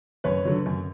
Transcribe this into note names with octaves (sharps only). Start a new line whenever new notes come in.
F#2 B4 C#5
D3 F#3
F#2